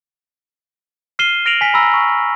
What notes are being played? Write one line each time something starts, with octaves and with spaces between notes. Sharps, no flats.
F6 C7 D#7 E7 G7
F6 A#6 D7 D#7 F7 F#7
G#5 B6
A#5 B5 E6 A#6
C#6